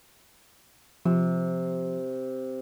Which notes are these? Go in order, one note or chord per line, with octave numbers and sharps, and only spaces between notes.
C3 F3